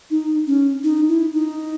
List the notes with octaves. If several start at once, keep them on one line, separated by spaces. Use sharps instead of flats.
D#4
C#4
D#4
E4
D#4